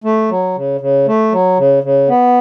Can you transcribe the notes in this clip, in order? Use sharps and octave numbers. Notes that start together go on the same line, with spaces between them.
A3
F#3
C#3
C#3
A3
F#3
C#3
C#3
B3